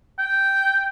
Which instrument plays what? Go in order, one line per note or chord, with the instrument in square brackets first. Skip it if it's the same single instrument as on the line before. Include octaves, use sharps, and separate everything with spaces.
[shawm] G5